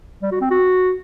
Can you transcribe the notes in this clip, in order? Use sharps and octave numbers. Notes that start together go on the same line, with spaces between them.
G3
F#4
C4
F#4